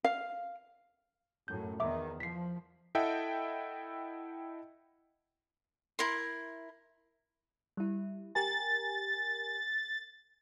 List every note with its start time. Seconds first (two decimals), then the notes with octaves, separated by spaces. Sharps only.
0.04 F5
1.48 F#2 A2 G6
1.80 E2 D#3 E5 D6
2.20 F3 B6 C7
2.95 E4 A4 D#5 E5 F#5 G5
5.99 E4 A#4 C6
7.77 G3 E4
8.35 G4 A#4 G#5 A6